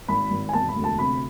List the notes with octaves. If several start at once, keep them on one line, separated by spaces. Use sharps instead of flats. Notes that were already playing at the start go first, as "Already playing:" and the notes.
G#1 B5
G#1
G#5
E1 A5
B5
D2
A5
C3 B5